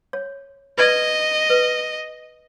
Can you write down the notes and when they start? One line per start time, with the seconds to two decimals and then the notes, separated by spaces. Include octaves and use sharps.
0.13 C#5
0.78 B4 D5 D#5
1.50 B4